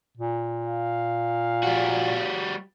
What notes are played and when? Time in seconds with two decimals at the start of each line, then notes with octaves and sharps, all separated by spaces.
0.17 A#2
0.67 F5
1.63 G3 F#4